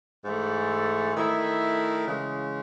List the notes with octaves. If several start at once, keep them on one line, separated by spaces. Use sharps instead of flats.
G#2 E3 A3
D#3 A3 E4
C#3 E3 G#3